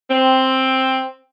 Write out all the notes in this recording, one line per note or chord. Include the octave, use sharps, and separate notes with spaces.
C4